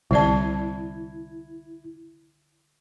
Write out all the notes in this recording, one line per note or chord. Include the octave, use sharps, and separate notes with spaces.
C2 D3 E4 D5 A5 G#6